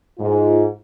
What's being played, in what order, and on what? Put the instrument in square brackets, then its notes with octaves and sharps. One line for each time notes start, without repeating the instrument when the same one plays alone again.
[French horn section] G#2 F4